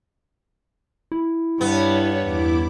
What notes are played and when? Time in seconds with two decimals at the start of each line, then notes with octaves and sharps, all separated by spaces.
1.12 E4
1.61 G2 B3 C#5
2.20 E2 E4 D6